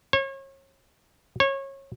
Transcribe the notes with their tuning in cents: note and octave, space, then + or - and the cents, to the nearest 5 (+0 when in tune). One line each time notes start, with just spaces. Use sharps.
C#5 -35
C#5 -25